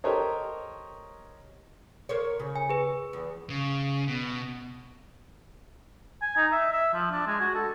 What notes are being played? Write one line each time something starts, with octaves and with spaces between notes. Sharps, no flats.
G4 A4 A#4 C5 C#5 D#5
A#4 C5 C#5
C#3
G#5
G#4 B4
E2
C#3
B2
G#5
D#4
E5
E5
F3
D4
G#3
F#4
A4